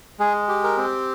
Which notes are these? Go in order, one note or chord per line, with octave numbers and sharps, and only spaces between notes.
G#3 G#4
G4
A#4
C4